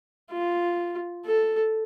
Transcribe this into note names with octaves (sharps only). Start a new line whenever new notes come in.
F4
A4